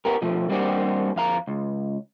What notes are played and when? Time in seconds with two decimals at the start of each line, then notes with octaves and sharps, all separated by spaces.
0.05 B3 G4 A#4
0.22 B2 F3 A3
0.49 G3 A#3 C4 D4 F#4 G4
1.16 F2 F5 A#5
1.47 C#2